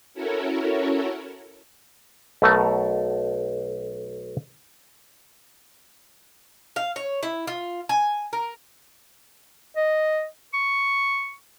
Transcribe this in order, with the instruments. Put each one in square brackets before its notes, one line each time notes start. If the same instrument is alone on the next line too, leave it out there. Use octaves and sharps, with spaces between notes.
[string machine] C#4 E4 F#4 A4 A#4 C#5
[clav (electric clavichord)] B1 B2 A3 A4 A#4 A#5
[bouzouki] F5
C#5
E4
F4
G#5
A#4
[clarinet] D#5
C#6